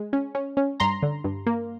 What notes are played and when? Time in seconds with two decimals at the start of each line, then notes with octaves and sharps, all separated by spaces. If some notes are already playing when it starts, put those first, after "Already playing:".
Already playing: G#3
0.13 C#4
0.35 C#4
0.57 C#4
0.80 G2 A#5 C6
1.02 D3
1.24 G2
1.46 A#3